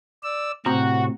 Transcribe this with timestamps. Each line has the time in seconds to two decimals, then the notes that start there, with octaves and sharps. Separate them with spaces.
0.24 D5 E6
0.66 A2 C3 C4 F#4 G5 A#5